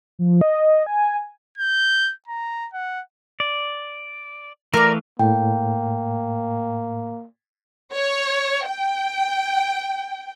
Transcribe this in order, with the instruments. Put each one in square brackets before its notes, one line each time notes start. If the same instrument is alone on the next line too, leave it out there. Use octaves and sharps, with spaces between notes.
[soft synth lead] F3
D#5
G#5
[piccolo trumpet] G6
A#5
F#5
[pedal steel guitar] D5
[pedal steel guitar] E3 A3 F5 [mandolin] A#4 D5
[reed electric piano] A2 [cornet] A#3 [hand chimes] G5
[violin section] C#5
G5